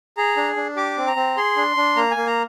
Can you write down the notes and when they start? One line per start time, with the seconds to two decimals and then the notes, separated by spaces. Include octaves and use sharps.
0.17 G#4 A#5
0.37 D4
0.56 D4
0.76 G4 D6
0.97 C4
1.07 A#5
1.16 C4
1.37 G#4 C6
1.56 D4
1.77 D4
1.96 A#3 A#5
2.11 G#5
2.16 A#3
2.27 A#5